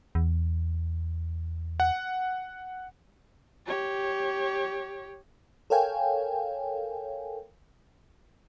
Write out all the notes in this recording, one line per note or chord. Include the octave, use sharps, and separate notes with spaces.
E2
F#5
G4 C#5
A4 A#4 C#5 F5 G5 G#5